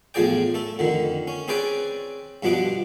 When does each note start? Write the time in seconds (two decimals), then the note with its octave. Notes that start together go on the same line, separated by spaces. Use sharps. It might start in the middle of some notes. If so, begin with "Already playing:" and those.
0.14 E2 A2 F3 G#4 D5 G5
0.54 A3 A4
0.79 F2 D3 D#3
1.28 C#4
1.48 C4 C#4 G#4 B4 D5 G5
2.43 G2 B2 F3 B3 D4 D6